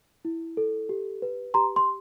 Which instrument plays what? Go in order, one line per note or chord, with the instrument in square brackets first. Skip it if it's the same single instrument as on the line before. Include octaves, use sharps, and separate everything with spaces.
[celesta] E4
A4
G4
B4
G4 A#5 C6
C6